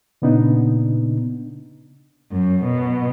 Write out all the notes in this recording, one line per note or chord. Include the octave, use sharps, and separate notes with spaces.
A#2 C#3 B3 D4 D#4
F#2
B2